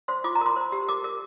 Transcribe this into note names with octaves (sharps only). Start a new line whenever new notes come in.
C5 C6
F4 D6
A#5
A#4 C6
C5
G4
A#4 D6
A#4